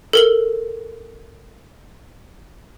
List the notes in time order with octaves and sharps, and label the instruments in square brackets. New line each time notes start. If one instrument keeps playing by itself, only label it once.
[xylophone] A4 A#4 F#7